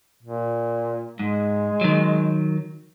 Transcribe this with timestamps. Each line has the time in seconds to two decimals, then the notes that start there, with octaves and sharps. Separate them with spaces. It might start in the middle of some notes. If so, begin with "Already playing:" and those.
0.23 A#2
1.19 G#2 G#3
1.81 D#3 F#3